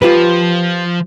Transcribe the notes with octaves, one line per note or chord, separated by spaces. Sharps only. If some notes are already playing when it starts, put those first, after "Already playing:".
F3 F4 G4 B4